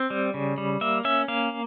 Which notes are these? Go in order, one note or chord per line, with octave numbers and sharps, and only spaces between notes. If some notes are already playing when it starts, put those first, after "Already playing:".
Already playing: C4
G3
C#3
G3
A#3 E5
C#4 E5
A#3 F5